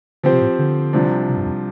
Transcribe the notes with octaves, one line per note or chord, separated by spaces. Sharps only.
D3 F3 C4 G4 C5
C3
A2
D3
C2 C3 F3 D4
C3
G2
F2